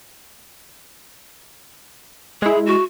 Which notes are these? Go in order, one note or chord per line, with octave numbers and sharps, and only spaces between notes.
G#3 E4 G#4
F#4